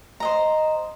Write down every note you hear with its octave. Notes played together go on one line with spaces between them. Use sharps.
C5 D#5 A#5